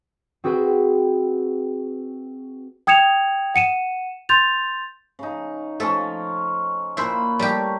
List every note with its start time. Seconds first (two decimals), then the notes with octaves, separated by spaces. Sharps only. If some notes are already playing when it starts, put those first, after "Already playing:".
0.44 C4 F#4 G#4 B4 G5
2.87 G5 D#6 G#6 C#7 E7 F7
3.55 F#5 C#7 D#7 E7
4.29 C6 G6 A6 F7
5.19 C#3 D#4
5.80 F3 A3 C#4 A4
6.97 A#2 E4 C5 B5
7.39 G3 A3 G4 A#4